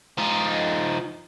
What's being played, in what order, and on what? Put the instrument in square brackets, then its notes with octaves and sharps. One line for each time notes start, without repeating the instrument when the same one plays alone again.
[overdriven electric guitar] F3 D#4